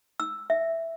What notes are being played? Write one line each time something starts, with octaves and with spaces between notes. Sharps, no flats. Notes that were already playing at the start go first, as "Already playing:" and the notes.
E6
E5